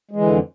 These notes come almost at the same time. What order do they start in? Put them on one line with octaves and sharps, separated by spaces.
G#3 E3 D3 F2